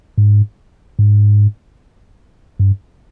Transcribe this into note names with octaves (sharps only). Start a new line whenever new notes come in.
G#2
G#2
G2